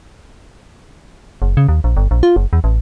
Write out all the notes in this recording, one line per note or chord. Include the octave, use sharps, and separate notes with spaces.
F#1
C#3
D#2
A#1
G1
A#1
F4
F#1
E2
A1